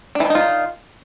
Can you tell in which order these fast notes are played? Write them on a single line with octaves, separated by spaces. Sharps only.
D4 E3 D#3 D#4 F4